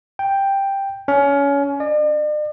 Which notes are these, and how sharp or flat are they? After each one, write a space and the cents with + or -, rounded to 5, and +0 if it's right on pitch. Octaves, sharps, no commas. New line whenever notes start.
G5 +5
C#4 +25
D5 +45